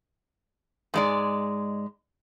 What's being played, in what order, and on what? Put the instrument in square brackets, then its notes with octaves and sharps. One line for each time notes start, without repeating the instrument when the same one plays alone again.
[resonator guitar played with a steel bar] G#2 G#3 D5